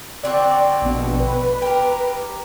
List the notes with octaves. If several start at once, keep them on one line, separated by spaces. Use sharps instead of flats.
D3 C4 F#4 D5
A#1 B2
B4
G4 A#4